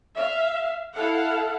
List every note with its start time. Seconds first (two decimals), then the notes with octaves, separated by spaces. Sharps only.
0.15 E5 F5
0.95 E4 A4 F5 F#5